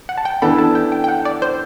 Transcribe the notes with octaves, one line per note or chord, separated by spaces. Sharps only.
F#5
A5
G5
E3 B3 D4 A4 B5
A5
G5
G5
G5
F#5
D5
C5